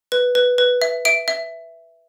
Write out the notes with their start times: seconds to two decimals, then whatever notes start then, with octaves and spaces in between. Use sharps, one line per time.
0.12 B4
0.35 B4
0.58 B4
0.82 E5
1.05 E5 D7
1.28 E5